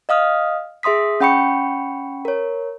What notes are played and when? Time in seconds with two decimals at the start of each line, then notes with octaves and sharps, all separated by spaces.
0.09 D#5 F5 D#6 F6
0.83 G#4 E5 C6 D#6 B6
1.20 C#4 F#5 G5 B5 C#6 C#7
2.25 A#4 C#5